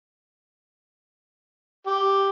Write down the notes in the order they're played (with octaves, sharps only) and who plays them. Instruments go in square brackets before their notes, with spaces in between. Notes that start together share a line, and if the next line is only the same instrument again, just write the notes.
[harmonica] G4